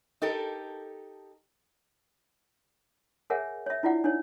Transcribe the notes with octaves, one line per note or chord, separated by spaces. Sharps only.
D#4 G4 A4 A#4
G#4 A#4 C#5 E5 F#5 G#5
C#5 E5
D4 E4 F4 D5 F#5
D4 D#4 C#5